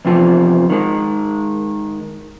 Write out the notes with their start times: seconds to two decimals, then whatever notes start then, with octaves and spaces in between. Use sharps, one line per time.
0.05 E2 C3 F3
0.70 D#3 G#3